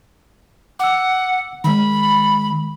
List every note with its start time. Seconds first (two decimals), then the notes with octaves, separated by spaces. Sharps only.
0.80 F#5 D6 E6
1.64 D#3 G#3 B5